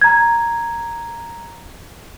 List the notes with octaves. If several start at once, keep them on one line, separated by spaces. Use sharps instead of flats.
A#5 G#6